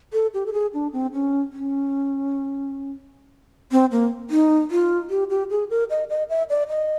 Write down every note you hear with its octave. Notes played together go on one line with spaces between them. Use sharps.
A4
G4
A4
G#4
D4
C4
C#4
C#4
C4
A#3
D#4
F4
G4
G4
G#4
A#4
D#5
D#5
E5
D5
D#5